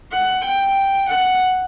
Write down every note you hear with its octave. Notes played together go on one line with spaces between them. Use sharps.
F#5
G5
F#5